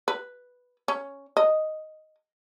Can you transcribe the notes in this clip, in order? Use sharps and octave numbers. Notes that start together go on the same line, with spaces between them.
B4
C#4
D#5